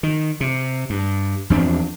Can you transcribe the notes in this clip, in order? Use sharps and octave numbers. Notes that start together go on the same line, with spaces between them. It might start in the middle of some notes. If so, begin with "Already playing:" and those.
D#3
C3
G2
E2 F3 C4 D4